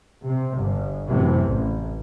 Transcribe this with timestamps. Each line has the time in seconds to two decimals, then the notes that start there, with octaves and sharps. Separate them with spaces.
0.24 C3
0.55 G1
1.08 F#2 A2 C3 E3
1.44 A1